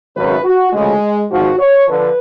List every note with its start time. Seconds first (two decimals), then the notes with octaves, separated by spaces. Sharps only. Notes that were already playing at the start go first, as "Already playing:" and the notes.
0.16 G#1 F#2 C#3 B4
0.44 F#4
0.73 D2 C#3 F3 G#3
1.31 G#1 G#2 F3 F#4
1.59 C#5
1.88 D3 F3 B4